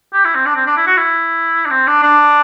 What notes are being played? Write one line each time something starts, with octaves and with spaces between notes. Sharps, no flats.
G4
E4
C4
D4
C4
D4
E4
F#4
E4
D4
C4
D4
D4